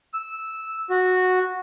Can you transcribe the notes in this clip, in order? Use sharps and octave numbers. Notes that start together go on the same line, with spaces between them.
E6
F#4